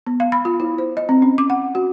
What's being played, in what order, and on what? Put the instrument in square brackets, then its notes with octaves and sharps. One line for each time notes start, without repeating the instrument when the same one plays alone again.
[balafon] B3
F5
B5
F4
E4
C5
D#5
C4
C#4
D6
F#5
F#4